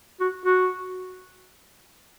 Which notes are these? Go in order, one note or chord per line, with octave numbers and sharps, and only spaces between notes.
F#4
F#4